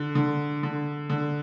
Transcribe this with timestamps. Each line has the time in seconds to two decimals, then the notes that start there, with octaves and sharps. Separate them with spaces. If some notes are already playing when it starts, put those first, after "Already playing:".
Already playing: D3
0.15 D3
0.63 D3
1.10 D3